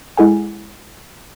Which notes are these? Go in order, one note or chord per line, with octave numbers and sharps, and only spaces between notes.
G#3 E4 G#4 A4 F#5 G#5